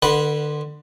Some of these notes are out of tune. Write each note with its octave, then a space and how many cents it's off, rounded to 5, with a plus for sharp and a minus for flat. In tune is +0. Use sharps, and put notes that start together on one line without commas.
D3 +25 B4 -10 F#5 -5